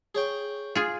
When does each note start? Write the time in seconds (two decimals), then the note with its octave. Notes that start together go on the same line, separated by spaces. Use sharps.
0.15 G#4 C#5 G5
0.75 F4 G#4